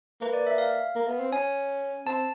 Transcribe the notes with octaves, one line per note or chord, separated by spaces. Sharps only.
A#3 B4
D5
E5
F5
A#3
B3
C4
C#4 G#5
C4 A5